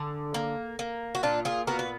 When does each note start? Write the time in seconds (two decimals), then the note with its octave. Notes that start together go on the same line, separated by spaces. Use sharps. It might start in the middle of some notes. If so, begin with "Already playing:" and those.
Already playing: D3 G#4
0.34 A#3
0.79 A#3
1.15 F#4
1.23 A#2 D4 F4
1.45 F4 G#4
1.67 B3 F#4 A#4
1.79 B4